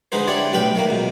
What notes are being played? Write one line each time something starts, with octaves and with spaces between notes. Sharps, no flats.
D3 G#3 D#4 B4 C5
D4 E4 G4 C#5 D5
B1 A2 G4 B4 G5 B5
D#3 A3 A#3
C#2 B2